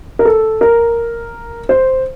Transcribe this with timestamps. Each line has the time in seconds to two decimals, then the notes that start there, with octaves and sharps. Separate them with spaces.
0.19 A#4
0.25 A4
0.61 A#4
1.69 C5